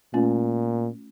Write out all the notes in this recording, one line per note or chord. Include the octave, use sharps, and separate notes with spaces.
A#2 A3 C#4 F4